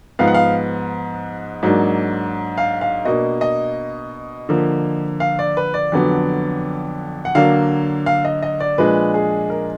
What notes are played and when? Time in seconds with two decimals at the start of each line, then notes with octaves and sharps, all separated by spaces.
0.19 G#2 F3 B3 F5
0.28 F#5
0.34 F5
1.63 G#2 F#3 A#3 D4
2.58 F5
2.81 F5
3.05 B2 A#3 D4 D#5
3.41 D#5
4.49 D3 F3 A#3
5.20 F5
5.39 D5
5.57 B4
5.74 D5
5.92 F2 D3 F#3 B3 D4
7.25 F#5
7.35 D3 F#3 A#3 D4 F5
8.06 F5
8.25 D#5
8.42 D#5
8.60 D5
8.78 A#2 F3 G#3 D4 B4
9.14 G#4
9.50 A#4